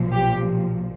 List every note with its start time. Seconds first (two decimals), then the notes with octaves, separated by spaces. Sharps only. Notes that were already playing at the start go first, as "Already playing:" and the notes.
Already playing: B1 A#2 F3
0.13 G4